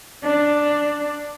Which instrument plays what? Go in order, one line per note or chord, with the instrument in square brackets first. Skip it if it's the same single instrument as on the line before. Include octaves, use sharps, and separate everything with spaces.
[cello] D4